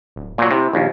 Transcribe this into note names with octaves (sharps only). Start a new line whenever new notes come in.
D1
A#2 F#3 A#3
C3 E4
A#1 D#2